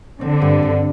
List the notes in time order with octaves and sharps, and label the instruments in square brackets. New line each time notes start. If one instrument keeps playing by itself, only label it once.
[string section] D3 [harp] C4
[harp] G2
G2